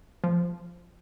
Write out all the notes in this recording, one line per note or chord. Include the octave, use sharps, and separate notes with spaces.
F3